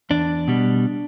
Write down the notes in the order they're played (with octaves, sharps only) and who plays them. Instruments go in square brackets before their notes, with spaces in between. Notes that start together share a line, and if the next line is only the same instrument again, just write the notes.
[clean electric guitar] E2 D4
B2 G3